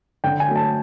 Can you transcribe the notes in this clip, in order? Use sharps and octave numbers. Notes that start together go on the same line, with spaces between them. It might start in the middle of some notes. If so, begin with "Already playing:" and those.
D3 G5
G#5
F#3 A3
A5